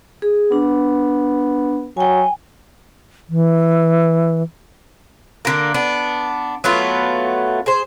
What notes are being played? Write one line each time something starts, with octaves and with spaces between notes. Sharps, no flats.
G#4
B3 D4
F#3 G5 G#5
E3
D3 A#3
B3 D4
F#3 A3 B3 F4
G#4 C5